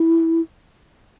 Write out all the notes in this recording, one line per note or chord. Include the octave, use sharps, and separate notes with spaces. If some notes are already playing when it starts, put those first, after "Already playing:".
Already playing: E4